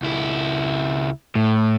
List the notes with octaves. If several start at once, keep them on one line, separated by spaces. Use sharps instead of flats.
C#2 E4
A2